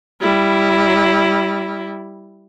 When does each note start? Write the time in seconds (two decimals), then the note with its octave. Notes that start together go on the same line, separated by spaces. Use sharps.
0.21 G3 E4